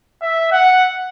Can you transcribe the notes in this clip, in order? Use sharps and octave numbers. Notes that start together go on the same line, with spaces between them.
E5
F#5